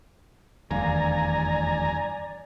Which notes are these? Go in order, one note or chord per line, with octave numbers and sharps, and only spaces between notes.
F1 E2 G2 D#3 D5 F5 G#5 A#5